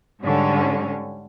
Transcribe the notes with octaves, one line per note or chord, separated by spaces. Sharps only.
G#2 D3 G3 C#4